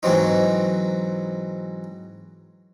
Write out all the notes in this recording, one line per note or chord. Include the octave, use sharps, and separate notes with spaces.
G#2 E3 F#3 C4 D#4